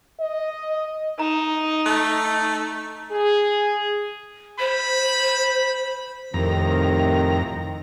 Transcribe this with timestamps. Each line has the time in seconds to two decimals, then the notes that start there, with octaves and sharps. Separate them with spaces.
0.20 D#5
1.20 D#4 A#5
1.86 A3
3.11 G#4
4.59 C5 B5
6.34 F2 A2 C3 D#3 A#5